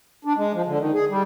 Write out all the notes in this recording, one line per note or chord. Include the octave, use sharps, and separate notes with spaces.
D4
G#3
F3
D3
D#3
G#4
G3